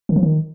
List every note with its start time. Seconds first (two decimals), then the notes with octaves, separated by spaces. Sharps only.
0.09 D#3
0.16 F3
0.23 D#3